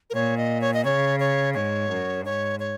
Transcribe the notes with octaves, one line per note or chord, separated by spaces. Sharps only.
A#4
A#2 C#5
D#5
C#5
D#5
C#3 C#5
C#5
G#2 C#5
F#2
G#2 C#5
C#5